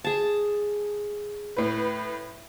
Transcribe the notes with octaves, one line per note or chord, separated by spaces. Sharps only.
G#4 A5
A2 B4